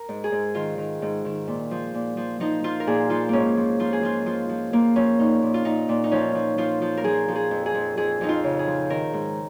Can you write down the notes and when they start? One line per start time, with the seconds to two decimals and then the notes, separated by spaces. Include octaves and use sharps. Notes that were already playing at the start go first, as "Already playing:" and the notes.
Already playing: A#4
0.09 G#2
0.24 G#4
0.32 G#2
0.55 D#3 F4
0.78 D#3
1.02 G#2
1.25 D#3
1.48 A#2
1.71 F3
1.94 A#2
2.17 F3
2.40 F3 D#4
2.64 F3 F4
2.80 A#4
2.87 A#2 G#4
3.10 F3 F4
3.29 G#2 A#3 C#4
3.57 F3
3.79 F3 F4
3.93 G#4
4.03 F3 F4
4.26 F3 F4
4.49 F3
4.73 F3 A#3
4.96 F3 C#4
5.19 A#2 D#4
5.42 A#2
5.54 F4
5.65 A#2 D#4
5.89 A#2
6.04 D#4
6.12 F3 C#4
6.35 F3
6.58 F3 F4
6.82 F3
6.97 A#4
7.04 F3 G#4
7.28 F3
7.36 G#4
7.51 F2
7.66 G#4
7.75 F2
7.97 F2 G#4
8.21 F2 D#4
8.29 F4
8.44 C#3
8.59 G#4
8.67 F3
8.90 D#3 A#4
9.13 G#2